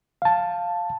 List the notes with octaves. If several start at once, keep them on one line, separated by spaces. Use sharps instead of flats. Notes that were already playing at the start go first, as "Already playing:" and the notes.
F5 A5